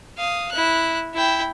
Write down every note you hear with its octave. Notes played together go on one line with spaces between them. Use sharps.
F5 D#6
E4 F#6
E4 G5